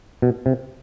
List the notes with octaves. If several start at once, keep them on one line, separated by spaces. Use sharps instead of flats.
B2
C3